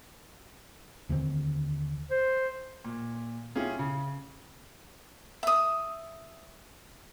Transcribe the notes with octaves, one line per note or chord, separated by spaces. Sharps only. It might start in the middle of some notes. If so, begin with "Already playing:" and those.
D#2 D3 D#3 C4
C5
A#2
C#4 E4 F4 G4 G#4
C#3
E5 D#6